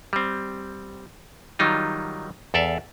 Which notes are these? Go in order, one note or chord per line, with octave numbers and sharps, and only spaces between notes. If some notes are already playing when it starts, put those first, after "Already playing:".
G3 C4
D#3 F#3 G3 D#4 F4
E2 A4 D5 E5 F5